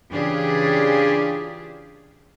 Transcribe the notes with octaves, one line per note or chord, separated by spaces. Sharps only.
C#3 E3 D4 F4 G4 G#4